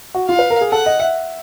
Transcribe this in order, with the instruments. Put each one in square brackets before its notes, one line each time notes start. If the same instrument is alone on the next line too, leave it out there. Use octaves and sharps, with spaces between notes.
[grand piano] F#4
[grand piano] F4 [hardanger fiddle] F5
[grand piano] B4
A#4
G#4
[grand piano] A4 [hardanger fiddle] F#5
[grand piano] D#5
E5